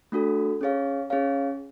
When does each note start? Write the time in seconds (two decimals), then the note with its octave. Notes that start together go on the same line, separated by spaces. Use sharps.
0.12 A3 D4 F#4 A4
0.61 C#4 G#4 C#5 F5
1.10 C#4 G#4 C#5 F5